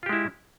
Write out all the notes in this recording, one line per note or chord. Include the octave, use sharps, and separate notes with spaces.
G#3 E4 F4 G4